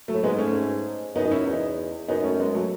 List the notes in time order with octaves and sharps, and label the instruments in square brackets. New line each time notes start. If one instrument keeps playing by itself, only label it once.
[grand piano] F#3 A3
[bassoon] A2
[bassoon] G#2 [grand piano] G#3 B3
[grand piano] A3 C#4
[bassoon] F#2 [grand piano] B3 D#4
[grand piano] D#4
C#4 E4
[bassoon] E2 [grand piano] B3 D#4
[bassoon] F#2 [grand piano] B3 D#4
[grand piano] A3 C#4
G#3 B3
F#3 A3